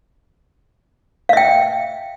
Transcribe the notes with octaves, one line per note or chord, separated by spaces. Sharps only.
E5 F5 G5